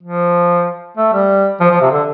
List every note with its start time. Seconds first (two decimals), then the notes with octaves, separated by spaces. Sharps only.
0.03 F3
0.97 A3
1.13 G3
1.60 F3
1.70 F3
1.81 C3
1.92 D3